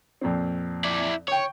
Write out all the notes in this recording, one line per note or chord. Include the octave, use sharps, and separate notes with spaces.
F2 A#2 C4
E4 D5
C#5 G5 C#6